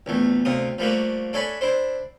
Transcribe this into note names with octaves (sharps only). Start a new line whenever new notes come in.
A#1 E2 A3
D2 C3 F4 D#6
F3 G3 A3 A#3 F#4
D4 A4 C#5 E5 G#5 B5
D4 E4 C5